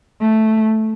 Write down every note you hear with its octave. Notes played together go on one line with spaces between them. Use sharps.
A3